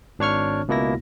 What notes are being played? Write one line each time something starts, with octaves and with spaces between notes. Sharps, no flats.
G#1 D4 C#5 C#6 F6
C#2 B2 A#3 E4 A#6